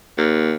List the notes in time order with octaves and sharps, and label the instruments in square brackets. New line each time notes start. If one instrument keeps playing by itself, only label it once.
[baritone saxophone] D#2